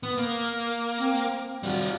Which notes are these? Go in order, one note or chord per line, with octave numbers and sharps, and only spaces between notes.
B3
A#3
C4
G3 F4 F#4